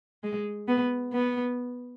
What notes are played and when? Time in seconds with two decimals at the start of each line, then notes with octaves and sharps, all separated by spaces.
0.23 G#3
0.68 B3
1.13 B3